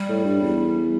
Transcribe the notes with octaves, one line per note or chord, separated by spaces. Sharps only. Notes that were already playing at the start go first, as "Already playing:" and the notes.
Already playing: G3
A2
G2
E2